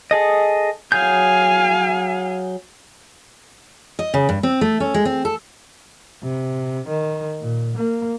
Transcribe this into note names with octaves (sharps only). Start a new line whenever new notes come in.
G#4 A4 D#5
F#3 G#4 F5 G#5 G6
D#5
C#3
G2
C4
A3
C#4
G#3
C4
A4
C3
D#3
A#2
A#3